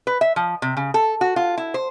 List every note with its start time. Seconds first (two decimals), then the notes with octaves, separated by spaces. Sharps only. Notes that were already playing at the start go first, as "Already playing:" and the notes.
0.07 B4
0.21 E5
0.36 F3
0.62 C3
0.77 C#3
0.94 A4
1.21 F#4
1.36 F4
1.57 E4
1.74 C5